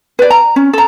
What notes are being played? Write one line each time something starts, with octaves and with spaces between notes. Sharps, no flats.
B4 D5
A#5
C#4
A4 A#5